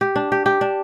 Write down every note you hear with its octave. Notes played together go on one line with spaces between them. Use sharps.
G4
D4
G4
G4
D4